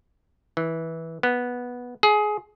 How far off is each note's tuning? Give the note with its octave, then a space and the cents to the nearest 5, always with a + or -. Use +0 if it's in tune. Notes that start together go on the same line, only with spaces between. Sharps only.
E3 -15
B3 -10
G#4 +20